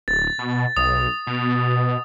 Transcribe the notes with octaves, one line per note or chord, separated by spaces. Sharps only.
D1 A6
B2
B1 D#6
B2